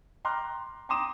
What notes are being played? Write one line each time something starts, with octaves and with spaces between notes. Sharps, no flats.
G5 A#5 C6 D6 F6 F#6
G5 A#5 C6 D6 D#6 E7